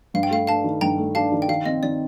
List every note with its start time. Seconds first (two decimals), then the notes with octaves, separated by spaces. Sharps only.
0.14 G2 F5
0.23 G5
0.31 A3 F5
0.47 D4 F5 A5
0.64 D#3
0.81 G2 G5 A#5
0.99 A3
1.15 D4 F5 A5
1.32 D#3
1.42 G5
1.48 D#3 F5
1.65 C4 D#5
1.83 D#3 D5